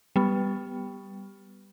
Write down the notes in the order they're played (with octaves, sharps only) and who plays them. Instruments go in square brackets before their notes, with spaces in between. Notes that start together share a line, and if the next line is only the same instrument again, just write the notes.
[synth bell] G3 B3